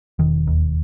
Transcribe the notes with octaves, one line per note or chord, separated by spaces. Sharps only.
E1 D#3
D#2